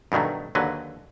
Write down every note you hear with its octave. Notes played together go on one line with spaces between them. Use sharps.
G2 B2 D#3 F#3 A3
D#2 D3 F#3 B4